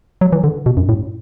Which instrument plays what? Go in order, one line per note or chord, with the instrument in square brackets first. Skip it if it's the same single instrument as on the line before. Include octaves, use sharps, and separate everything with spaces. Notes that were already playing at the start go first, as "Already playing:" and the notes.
[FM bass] F#3
E3
D3
B2
F#2
A2